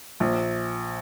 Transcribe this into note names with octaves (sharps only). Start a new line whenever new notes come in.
A#1